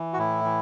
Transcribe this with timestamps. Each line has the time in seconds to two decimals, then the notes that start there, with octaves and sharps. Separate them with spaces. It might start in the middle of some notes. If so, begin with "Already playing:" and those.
Already playing: E3
0.13 F#4
0.18 A2 E4
0.45 E3